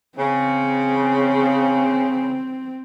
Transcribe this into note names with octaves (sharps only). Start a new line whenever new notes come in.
C#3 C4